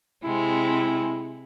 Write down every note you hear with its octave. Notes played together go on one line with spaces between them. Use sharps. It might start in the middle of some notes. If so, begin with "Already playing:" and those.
C3 G#3 C4 E4